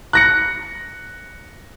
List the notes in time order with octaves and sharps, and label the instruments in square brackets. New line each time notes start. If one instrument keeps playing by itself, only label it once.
[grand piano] F#6 A#6 C#7